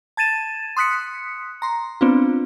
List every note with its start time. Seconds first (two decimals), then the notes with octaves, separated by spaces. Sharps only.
0.17 A5 G#6 A6 D#7 E7
0.77 C6 D#6 F#6 B6 C#7
1.62 A#5 C6
2.01 B3 C4 D4 F4